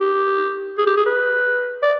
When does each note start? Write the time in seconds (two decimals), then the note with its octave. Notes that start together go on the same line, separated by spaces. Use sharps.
0.01 G4
0.78 G#4
0.86 G4
0.97 G#4
1.06 B4
1.82 D5